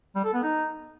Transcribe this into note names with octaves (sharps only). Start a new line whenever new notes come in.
G3
A4
B3
D#4